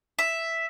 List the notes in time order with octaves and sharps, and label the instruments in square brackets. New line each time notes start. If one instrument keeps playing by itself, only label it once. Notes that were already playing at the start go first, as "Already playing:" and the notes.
[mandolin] E5